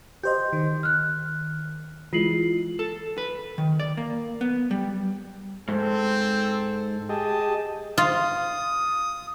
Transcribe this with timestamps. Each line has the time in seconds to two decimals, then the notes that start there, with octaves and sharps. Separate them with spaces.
0.23 G4 C5 D#5 C6 G6
0.53 D#3
0.83 F6 F#6
2.13 E3 G#3 F4 C7 F#7
2.79 A4
3.18 B4
3.58 D#3
3.80 D5
3.97 A#3
4.41 B3
4.71 G3
5.68 G#2 C4 A4
7.09 G4 G#4 D#5 A5
7.98 F4 D#6